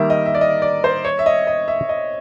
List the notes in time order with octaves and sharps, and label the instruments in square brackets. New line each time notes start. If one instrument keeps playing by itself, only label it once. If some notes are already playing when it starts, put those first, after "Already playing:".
Already playing: [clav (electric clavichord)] D#3 G3 A#3 [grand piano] A#4 E5
[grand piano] D#5
E5
D5
D#5
D5
C5
C#5
E5
D#5
D#5
E5
D#5